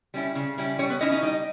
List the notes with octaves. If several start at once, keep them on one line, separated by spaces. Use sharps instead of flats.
G3 C#4 E4
C#3
G3 C#4 E4
G3 C#4 C#5
B3 B4
C#4 D#4 E4 D#5
D#4 D#5
G3 D#4 D#5